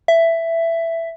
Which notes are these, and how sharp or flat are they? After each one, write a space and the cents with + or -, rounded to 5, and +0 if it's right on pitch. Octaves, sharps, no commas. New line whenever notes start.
E5 +10